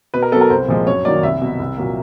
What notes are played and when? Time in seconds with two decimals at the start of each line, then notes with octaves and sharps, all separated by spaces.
0.14 B2 B4
0.23 A#4
0.32 F#3 B3 A4
0.41 A#4
0.50 C2 C5
0.68 A#2 F3 G#3
0.86 F#2 C#5
1.05 D#3 F#3 A#3 D5
1.23 C2 E5
1.42 B2 F#3
1.59 C2
1.77 A#2 F#3 A#3